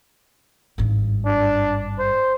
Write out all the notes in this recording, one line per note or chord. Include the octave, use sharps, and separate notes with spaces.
G#1 G2
D4
C5